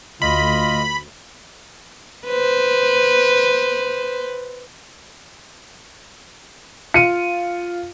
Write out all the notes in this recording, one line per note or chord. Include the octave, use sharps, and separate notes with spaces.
D2 F4 D#5 B5
B4 C5
F4 C#7 D#7